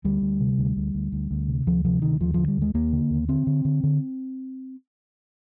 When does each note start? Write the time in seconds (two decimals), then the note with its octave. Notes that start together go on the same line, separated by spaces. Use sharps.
0.05 D2 G3
0.22 D2
0.40 C3
0.58 D2
0.76 D2
0.95 D2
1.12 D2
1.31 D2
1.48 C3
1.67 D2 F3
1.85 C3 F3
2.02 D2 D#3
2.20 D#2 F3
2.34 D3 F3
2.48 G3
2.57 D#2 G#3
2.74 D#2 A#3
2.93 D3
3.10 D#2
3.28 D3 C4
3.47 D3
3.65 D3
3.83 D3